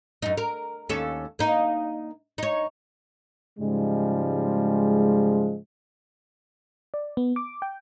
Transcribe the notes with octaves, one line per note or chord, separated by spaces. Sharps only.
F#2 D#4
A#4
D#2 C#4 A4
A#3 D#4
D#4 C#5
G#2 C#3 F3 G3 G#3
D5
B3
D6
G5